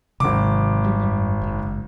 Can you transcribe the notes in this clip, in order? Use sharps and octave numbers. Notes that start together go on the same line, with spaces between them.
G#1 C3 D#3 F#3 D6
F#3 G3
F#2 G3
F#1 G#2